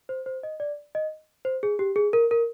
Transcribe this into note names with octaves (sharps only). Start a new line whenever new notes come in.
C5
C5
D#5
D5
D#5
C5
G#4
G4
G#4
A#4
A#4